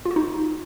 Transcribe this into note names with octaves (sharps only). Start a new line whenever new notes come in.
F4
F#4
D#4